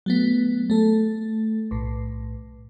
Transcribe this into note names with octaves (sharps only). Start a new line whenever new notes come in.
F#3 A3 B3
A3 A4
B1 A2